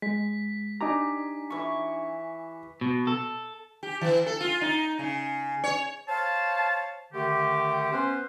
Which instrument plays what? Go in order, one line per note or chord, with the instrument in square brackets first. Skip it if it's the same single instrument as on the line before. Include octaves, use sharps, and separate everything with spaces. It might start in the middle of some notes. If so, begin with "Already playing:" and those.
[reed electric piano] G#3 [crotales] B6
[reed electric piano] D4 D#4 A#5 [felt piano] G4 G#5 D6
[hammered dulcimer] E3 C#6
[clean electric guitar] B2
A4
[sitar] G4
E3
A4
F4
D#4
C#3
C#5
[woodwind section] C5 C#5 F5 A5
D3 D#3 A3 G4
B3 C#4 B4 C5